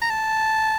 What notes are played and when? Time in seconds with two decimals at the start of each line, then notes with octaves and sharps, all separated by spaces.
0.02 A#5
0.10 A5